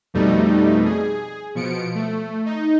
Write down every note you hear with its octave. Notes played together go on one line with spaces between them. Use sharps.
F2 B2 G3 A3 D#4
G#4
B2 F3 C#7 D7
A3
D#4